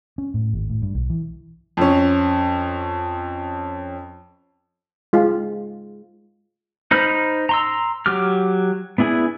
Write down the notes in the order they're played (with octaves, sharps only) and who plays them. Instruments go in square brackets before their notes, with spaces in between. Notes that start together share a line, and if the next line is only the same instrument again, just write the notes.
[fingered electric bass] C#4
A2
G#1
A2
G2
B1
E3
[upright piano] F2 C#4
[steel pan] G#3 F4
[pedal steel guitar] D#4 C5 B5 F6
A#5 C6 E6
F#3 G4 D6 F6
B3 D4 E4 G#4